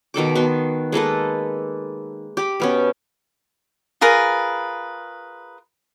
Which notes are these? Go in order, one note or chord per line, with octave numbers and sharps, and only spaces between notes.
B2 D#3 A4 D6
B3 F#4 C6
G#3 A#3 A4 B4
G4 B5
B2 B3 C#4
F4 G#4 A#4 B4